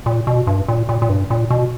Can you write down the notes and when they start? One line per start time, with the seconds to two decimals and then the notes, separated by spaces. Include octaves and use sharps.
0.06 A#2
0.27 B2
0.47 G2
0.68 A#2
0.89 A#2
1.02 A#2
1.09 G2
1.30 A#2
1.50 B2